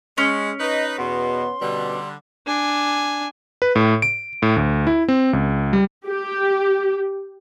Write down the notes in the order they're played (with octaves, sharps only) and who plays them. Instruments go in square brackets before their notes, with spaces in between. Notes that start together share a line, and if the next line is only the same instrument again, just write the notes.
[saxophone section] G#3 [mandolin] C#4
[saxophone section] D#4 B4 [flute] D#5
[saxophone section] E2 B2 [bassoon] B3 [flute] C6
[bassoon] B2 [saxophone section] D3 G3
[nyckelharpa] D4 G#5
[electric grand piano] B4
A2
D7
A2
D2
E4
C4
C#2
G3
[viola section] G4